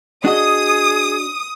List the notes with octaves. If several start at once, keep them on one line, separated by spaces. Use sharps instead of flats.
D4 F#4 G#4 D#5 D#6